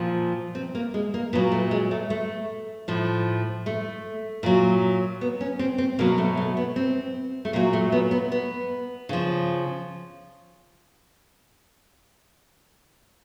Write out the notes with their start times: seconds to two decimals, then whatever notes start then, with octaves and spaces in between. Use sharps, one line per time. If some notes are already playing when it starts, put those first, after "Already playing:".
Already playing: A#2 F3
0.55 C4
0.75 A#3
0.94 G#3
1.14 A#3
1.33 A#2 F#3 B3
1.52 A3
1.71 G#3
1.91 A3
2.10 A3
2.88 A2 F3
3.66 A3
4.43 A#2 F#3
5.21 B3
5.41 C#4
5.59 C4
5.78 C4
5.99 B2 F#3 A#3
6.18 A3
6.37 A3
6.57 B3
6.76 C4
7.45 A3
7.53 A#2 F#3 A#3
7.73 A3
7.92 B3
8.11 B3
8.32 B3
9.09 C#3 F3